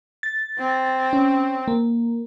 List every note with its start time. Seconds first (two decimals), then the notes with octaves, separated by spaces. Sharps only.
0.23 A6
0.58 C4
1.13 C#4
1.68 A#3